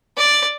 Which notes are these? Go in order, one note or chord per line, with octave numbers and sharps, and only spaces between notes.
D5